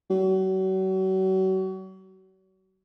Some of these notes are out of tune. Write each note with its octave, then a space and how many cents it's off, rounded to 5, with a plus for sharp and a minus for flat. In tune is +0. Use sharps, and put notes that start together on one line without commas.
F#3 +35